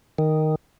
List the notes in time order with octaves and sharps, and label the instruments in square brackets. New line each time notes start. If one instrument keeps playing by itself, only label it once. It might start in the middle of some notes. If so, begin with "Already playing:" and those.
[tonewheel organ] D#3